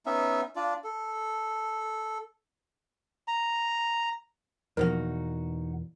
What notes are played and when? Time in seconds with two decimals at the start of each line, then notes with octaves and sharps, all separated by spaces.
0.06 B3 C#4 D#4 E5
0.56 D4 F4 D5
0.84 A4
3.28 A#5
4.77 E2 B2 F3 A#3 D#4 F#4 A#4